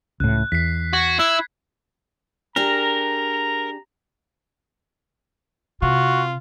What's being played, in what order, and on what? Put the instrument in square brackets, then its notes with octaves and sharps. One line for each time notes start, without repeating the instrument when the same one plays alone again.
[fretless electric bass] C#2 A2 [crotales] F#6
[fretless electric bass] E2 [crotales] B6 C7
[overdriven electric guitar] F#4 [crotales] G#6
[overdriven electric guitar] E4 [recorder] E6
[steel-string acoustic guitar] D4 G4 G#4 [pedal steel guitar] A#4 [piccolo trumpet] A#5
[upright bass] C3 [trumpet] F4 [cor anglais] F#4